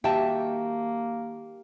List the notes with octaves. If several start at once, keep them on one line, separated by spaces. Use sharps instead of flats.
D#3 A#3 F#4 G4 E5 G5 A5